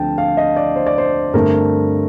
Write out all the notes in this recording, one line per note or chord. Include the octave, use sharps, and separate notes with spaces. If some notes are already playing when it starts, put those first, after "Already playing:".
Already playing: D2 D3 F3 C4 G5 A5
F5
D#5
D5
C5
D5
C5
G2 D3 A3 C4 A#4